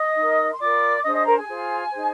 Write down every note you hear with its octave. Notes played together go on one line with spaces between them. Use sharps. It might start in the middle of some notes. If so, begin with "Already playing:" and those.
Already playing: D#5 D#6
D#4 A#4
C6
F4 A#4 D5 D6
D6
D4 G#4 C5 D#5 D#6
D#5 D#6
A#4 A#5
G#4 G#5
F4 G#4 C5
D#4 G#4 C5